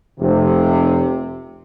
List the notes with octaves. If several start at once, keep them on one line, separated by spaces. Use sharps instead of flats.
F1 C3